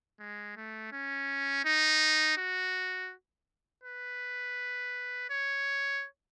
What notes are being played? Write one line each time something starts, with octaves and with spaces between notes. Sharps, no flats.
G#3
A3
C#4
D#4
F#4
B4
C#5